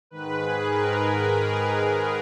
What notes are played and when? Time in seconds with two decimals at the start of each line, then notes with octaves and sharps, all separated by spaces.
0.10 G#2 D#3 B4
0.40 G#4
0.68 A#4
0.97 B4
1.82 B4